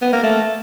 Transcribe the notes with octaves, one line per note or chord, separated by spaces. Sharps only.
B3
A#3
A3